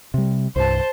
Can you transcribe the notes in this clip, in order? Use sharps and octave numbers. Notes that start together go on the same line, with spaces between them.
C3 G3
C2 G2 C5 A5